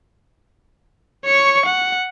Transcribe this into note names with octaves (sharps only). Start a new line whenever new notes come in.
C#5 C#6
F#5